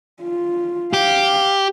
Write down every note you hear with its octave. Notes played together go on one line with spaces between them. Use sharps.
F4
G4 F5